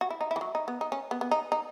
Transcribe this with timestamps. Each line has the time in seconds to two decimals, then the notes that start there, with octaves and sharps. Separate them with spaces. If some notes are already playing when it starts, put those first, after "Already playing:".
0.01 F#4
0.10 E4
0.21 D#4
0.31 E4
0.36 E3
0.41 F#3
0.55 D#4
0.68 B3
0.81 D#4
0.92 C#4
1.11 B3
1.21 B3
1.31 D#4
1.52 D#4